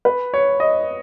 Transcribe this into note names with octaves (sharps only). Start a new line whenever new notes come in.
B4
C#5
D#5